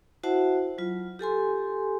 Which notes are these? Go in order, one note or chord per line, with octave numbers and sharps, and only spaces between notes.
E4 F#4 C5 E5 F#5 A5
F#3 F4
G4 A4 G#5 C6